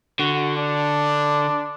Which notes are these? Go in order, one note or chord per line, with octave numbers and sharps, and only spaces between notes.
D3 F#4
D4